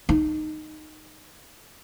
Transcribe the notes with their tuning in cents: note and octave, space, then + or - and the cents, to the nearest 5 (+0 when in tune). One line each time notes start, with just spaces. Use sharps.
D#4 -10